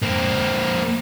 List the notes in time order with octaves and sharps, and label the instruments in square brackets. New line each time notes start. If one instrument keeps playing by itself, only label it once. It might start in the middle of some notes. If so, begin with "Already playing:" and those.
[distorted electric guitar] A#3 C4